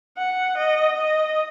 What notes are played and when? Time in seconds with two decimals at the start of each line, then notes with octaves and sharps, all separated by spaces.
0.18 F#5
0.58 D#5
0.96 D#5